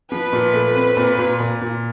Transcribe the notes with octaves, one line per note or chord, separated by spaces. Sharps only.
F3 B4
A#2
A3
C4
A#2
A#2
A#2
A#2